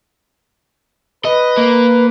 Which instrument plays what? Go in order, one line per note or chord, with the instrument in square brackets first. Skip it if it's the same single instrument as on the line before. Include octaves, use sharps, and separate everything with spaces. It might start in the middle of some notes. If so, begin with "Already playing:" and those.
[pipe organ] B4 [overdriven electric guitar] D#5
[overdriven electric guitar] A#3